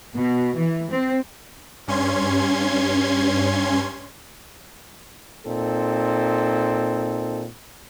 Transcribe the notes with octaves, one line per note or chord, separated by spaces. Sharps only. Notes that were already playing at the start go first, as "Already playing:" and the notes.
B2
E3
C4
G2 C#4 C6 G#6
A#2 C4 D#4 A4